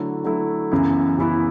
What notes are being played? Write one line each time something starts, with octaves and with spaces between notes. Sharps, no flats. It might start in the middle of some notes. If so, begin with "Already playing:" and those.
Already playing: D3 F#3 A3 E4
D3 F#3 A3 E4
F#2 C#3 E3 B3 E4
F#2 C#3 E3 B3 E4